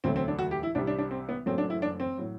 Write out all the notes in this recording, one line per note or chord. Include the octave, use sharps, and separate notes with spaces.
E1 D2 D3 F#3 A3 C4
C4
D4
F#4
G4
E4
C2 C3 G3 D4
D4
D4
C4
B3
F#1 F#2 F#3 A3 C4
D4
E4
D4
C4
A2 F#3